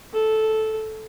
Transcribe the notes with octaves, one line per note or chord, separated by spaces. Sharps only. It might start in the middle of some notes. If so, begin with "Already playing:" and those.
A4